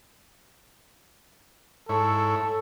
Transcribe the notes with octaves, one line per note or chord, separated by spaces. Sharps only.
G#2 E4 A4 C#5